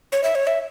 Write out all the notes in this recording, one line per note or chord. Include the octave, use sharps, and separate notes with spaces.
C#5
E5
C#5
E5